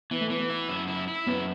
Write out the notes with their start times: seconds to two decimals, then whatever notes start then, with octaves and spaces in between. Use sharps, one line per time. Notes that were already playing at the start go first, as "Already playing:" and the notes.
0.11 E3 B3
0.21 A3
0.30 E3 B3
0.40 B3
0.50 E4
0.69 F#2
0.88 E4
1.08 E4
1.27 F#2 B3